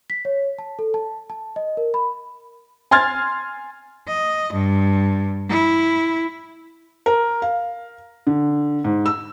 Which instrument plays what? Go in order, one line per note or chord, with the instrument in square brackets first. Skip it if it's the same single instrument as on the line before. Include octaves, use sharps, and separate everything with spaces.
[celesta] B6
C#5
A5
A4
A5
A5
D#5
A#4
B5
[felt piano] G#5 C6 F6 G#6 A6
[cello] D#5
G2
E4
[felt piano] A#4
F5
D3
G#2
E6